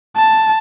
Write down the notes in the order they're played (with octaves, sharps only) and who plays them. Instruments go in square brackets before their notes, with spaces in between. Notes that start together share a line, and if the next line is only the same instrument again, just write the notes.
[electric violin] A5